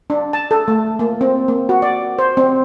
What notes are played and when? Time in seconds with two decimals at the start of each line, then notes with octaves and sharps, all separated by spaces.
0.10 D4
0.33 A5
0.51 A4
0.68 A3
0.99 A#3
1.21 C4
1.48 A#3
1.69 F#4
1.82 D5
2.19 C5
2.37 C4